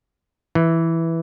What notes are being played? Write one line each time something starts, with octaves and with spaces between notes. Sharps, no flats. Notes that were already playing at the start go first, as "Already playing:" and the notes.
E3